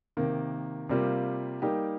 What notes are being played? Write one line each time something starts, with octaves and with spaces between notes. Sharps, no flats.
C3 D#3 A#3
C3 G3 A#3 F4
G3 A#3 D#4 G4